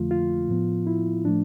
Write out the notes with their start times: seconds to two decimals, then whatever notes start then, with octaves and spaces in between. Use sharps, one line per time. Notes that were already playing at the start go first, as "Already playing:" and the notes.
Already playing: F2 D3 F3 A3 F4
0.11 F4
0.49 A2 F3 B3
0.87 E4
1.25 A2 F3 A3 D4